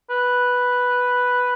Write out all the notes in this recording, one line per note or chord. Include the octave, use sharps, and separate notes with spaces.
B4